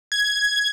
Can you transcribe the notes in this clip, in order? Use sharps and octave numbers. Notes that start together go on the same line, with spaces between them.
G#6